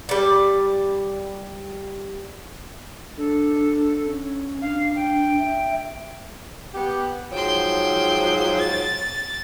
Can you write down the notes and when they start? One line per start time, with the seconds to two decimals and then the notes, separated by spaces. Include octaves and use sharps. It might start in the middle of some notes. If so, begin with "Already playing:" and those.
0.09 G3 D5
3.17 D4 A4
4.06 C#4
4.62 D4 F5
4.95 G5
5.39 E5
6.74 B3 G4
7.32 G#2 F3 F#3 G5 C6
8.58 A6